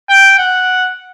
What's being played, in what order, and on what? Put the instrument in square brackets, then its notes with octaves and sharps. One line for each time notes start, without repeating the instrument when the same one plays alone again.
[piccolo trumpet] G5
F#5